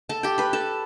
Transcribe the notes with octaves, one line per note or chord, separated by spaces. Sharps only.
A4 A5
G4 G5
B4 B5
A4 A5